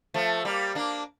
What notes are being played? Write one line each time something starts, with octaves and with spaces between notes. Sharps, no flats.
F3 A3
G3 A#3
A#3 D4